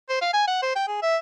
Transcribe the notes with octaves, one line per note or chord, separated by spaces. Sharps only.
C5
F5
G#5
F#5
C5
G5
G#4
E5